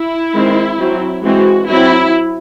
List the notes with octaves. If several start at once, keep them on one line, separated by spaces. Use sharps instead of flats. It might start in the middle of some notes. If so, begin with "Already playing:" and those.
Already playing: E4
D#3 G#3 C4
F#3 C4
E3 G#3 C4 F#4
F#3 C4 E4